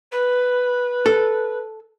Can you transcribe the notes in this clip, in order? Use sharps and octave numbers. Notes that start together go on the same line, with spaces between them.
B4
A4